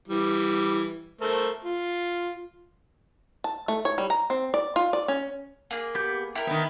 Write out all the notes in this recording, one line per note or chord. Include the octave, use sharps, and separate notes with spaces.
E3 G3
A3 A#4 C5
F4
A5
A3
C#5
G3
A#5
C4
D5
F4
D5
C#4
A#3 G#4
B3 G4 G6
E4 A#4 G5
D#3 B3